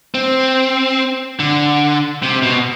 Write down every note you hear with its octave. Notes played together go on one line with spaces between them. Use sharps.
C4
D3
C3
B2